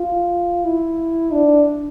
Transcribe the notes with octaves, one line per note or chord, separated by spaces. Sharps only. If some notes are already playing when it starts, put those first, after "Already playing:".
Already playing: F4
E4
D4